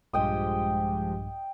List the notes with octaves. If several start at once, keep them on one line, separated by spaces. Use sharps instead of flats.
A#1 G2 F3 G#3 G4 D#5 G5 D#6